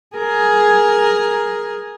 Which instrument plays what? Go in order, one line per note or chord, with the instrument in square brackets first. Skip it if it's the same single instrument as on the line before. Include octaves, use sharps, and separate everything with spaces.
[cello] G#4 A#4